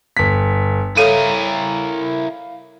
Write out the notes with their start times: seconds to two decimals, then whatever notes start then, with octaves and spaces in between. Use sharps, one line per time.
0.17 G1 B6
0.97 E4 A4 A#4 C#5 F5 D#6 D#7